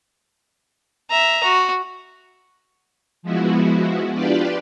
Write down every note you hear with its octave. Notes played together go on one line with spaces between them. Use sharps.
E5 A#5
F#4
F3 G#3 B3 E4 F#4
D4 F4 G4 B4 D5